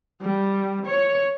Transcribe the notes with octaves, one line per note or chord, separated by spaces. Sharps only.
G3
C#5